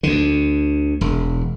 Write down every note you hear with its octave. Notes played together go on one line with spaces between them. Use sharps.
D2 D3
E1